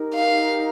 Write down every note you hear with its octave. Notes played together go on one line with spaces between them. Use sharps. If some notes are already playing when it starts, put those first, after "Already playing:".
Already playing: D#4 G4 A#4
F5